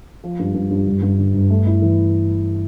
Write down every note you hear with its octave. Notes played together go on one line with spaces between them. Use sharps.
F3
G2
G2
G2
G1
G2
D3
G1
A3
E4
E3